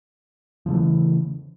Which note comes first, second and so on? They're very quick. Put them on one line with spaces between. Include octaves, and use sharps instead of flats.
F3 C#3 A3 E3